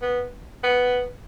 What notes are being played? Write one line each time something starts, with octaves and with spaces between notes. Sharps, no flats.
B3
B3